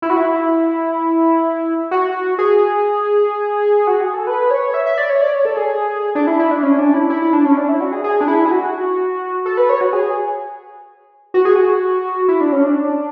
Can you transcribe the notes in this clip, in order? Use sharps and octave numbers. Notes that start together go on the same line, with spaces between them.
E4
F#4
E4
F#4
G#4
F#4
G#4
A4
B4
C#5
E5
E5
D5
C#5
D5
C#5
A4
G#4
D4
E4
E4
D4
C#4
D4
E4
E4
E4
D4
C#4
D4
E4
F#4
G#4
G#4
D4
E4
G#4
F#4
A4
B4
C#5
F#4
G#4
F#4
G#4
F#4
E4
D4
C#4
D4